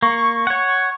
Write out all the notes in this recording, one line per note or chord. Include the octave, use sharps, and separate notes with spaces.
A#3 C#6
C#6
C#5 F#5